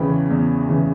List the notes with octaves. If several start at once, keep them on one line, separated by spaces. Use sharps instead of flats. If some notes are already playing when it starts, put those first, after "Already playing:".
Already playing: E2 C#3 E3 G5 B5
E2
C#3 E3